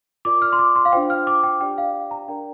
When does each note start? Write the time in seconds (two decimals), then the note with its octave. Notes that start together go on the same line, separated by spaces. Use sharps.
0.25 F4 A#4 D5 D6
0.42 F6
0.53 C6
0.59 D6
0.76 C6
0.85 F5
0.92 D4 F4 C5 G5
1.10 F6
1.27 D6
1.44 G5
1.61 D4 G4 D5 G5
1.78 F5
2.11 A#5
2.28 D4 A#4 D5 G5